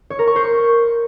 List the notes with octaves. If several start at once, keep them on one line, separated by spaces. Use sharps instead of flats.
C#5
A#4
C#6
C5
C#6